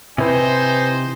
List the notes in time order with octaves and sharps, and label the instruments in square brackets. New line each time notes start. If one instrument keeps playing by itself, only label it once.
[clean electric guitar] C3 E3 [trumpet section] D#4 C5 G#5 [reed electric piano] E4 B4